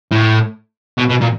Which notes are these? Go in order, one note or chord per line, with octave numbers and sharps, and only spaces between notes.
A2
B2
B2
A#2